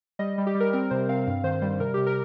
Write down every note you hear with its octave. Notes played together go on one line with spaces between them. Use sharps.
G3 D#5
G3
G4
G3
A#4
C4 A#4
C3 C5
C4 F5
G2 F5
D#3 C5
G3 C5
C3 A#4
C3 G4
A#4